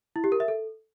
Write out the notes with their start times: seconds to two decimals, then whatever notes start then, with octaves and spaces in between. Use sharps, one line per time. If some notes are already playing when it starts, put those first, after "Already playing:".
0.16 E4
0.24 G4
0.32 A#4
0.40 E5
0.48 A4